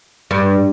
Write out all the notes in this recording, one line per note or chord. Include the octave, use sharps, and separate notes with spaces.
G2